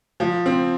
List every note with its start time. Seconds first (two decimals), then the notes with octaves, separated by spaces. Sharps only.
0.20 F3
0.46 C4